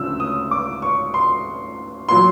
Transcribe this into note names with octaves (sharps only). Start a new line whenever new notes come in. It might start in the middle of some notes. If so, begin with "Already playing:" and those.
Already playing: D2 C#3 F3 E6
D#6
D6
C#6
C6
A#2 F#3 C6